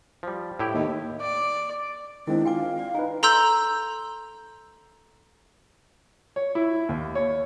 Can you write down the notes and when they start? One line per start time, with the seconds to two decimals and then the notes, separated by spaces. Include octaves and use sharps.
0.23 F3 G3
0.59 A2 E4 G4
0.74 D#2
1.20 D5
2.27 D#3 G#3 C4 D4 E4
2.45 F4 F5 G5 G#5 D6
2.79 D5
2.95 D#4 G#4 B4
3.23 A4 A#5 C6 E6 G6
6.36 C#5
6.55 E4
6.89 D#2
7.15 C#5